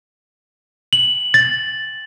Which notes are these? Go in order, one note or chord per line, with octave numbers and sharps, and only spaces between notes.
F#7
A6